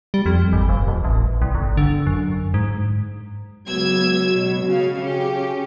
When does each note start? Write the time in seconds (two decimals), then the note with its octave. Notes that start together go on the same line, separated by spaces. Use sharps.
0.14 G3
0.26 F2
0.53 G#1
0.69 F1
0.88 D#1
1.04 A1
1.42 C2
1.55 G1
1.77 D3
2.07 F#2
2.54 G#2
3.67 C#2 F#3 B3 E6 G#6
3.98 F#4
4.33 B2
4.64 C#3 F5
5.00 C#3 C#4 G4